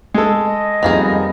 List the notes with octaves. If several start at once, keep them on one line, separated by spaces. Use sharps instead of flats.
G#3 A4
D#5
F2 D#3 G3 A#3 B3 G#4